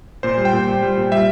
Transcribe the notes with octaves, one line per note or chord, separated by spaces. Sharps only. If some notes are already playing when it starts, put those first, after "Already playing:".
A#2 C5
G3
G5
A#2
A#2
G3
A#2
G3 E5